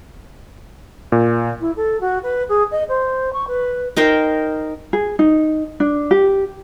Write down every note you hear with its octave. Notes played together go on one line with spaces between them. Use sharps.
A#2
E4
A4
F#4
B4
G#4
D#5
C5
C#6
B4
D#4 A#4 C5 G5
G#4
D#4
D4
G4